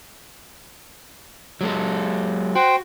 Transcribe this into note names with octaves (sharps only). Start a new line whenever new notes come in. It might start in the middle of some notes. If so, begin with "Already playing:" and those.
F#3 G#3 A4
F#4 C5 G5